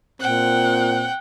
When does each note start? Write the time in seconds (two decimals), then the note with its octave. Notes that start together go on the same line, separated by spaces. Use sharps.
0.21 A#2 C4 F#5 G5